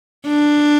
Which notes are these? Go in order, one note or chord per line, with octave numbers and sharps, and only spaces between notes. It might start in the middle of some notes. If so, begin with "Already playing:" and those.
D4